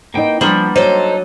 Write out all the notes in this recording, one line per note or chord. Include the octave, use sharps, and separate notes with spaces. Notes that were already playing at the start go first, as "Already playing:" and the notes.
A#3 B3 D#4 G5
F3 G3 A#3 B3 D4 B5
F#3 D#4 A4 C5